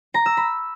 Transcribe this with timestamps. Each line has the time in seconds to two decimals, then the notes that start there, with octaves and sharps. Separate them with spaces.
0.14 A#5
0.26 E6
0.37 B5